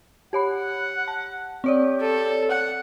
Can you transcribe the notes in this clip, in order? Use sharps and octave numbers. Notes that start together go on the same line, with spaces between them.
G4 C#5 F#5 B5
A5
C4 G4 C#5 D5
A4
F#5